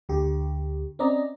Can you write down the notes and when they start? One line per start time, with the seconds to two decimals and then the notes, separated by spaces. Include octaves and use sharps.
0.09 D2 D3 G4
0.99 C4 C#4 D5 D#5 A#5